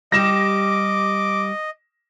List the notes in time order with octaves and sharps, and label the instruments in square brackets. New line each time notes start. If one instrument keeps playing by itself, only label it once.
[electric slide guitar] G3 G4 [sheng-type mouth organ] D#5 [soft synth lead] D6 [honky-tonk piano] A#6 E7